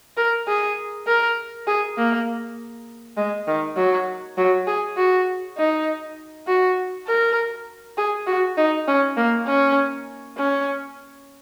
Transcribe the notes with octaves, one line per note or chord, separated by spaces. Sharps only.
A#4
G#4
A#4
G#4
A#3
G#3
D#3
F#3
F#3
G#4
F#4
D#4
F#4
A#4
G#4
F#4
D#4
C#4
A#3
C#4
C#4